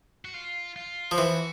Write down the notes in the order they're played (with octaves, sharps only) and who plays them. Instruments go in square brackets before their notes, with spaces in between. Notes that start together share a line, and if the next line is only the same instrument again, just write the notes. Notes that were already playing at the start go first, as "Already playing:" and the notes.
[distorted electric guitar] F#4
F4
F4
[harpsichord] F3
[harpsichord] E3 [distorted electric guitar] F#4